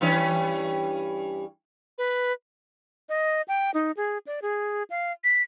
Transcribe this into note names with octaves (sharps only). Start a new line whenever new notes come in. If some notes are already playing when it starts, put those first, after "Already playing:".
G2 E3 C#4
B4
D#5
G5
D#4
G#4
D5
G#4
F5
B6